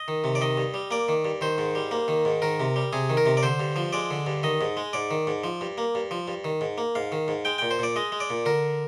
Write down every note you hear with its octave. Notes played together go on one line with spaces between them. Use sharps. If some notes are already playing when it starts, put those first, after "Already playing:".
Already playing: D#5
D#3
C3
D5
D#3 D#5
G2
G3
A#3 D5
D#3
G2
D#3 C5
G#2
G3
A#3
D#3
G#2
D#3 A#4
C3
G3
C3 G#4
D#3
A#4
C3
D5
D3 C5
G2
F3
G#3 D5
D3
G2
D#3 D#5
G#2
G#3
G#2 D5
D#3
G#2
F3
G2
A#3
G2
F3
G2
D#3
G#2
A#3
G#2 F5
D#3
G#2
G#3 G5
A#2 G5
C5
A#2 D5
G#3 D#5
G#3
D5
A#2
D3 A#4